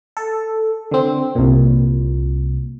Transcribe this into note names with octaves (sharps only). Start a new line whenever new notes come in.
A4
D3 C4
C2 A#2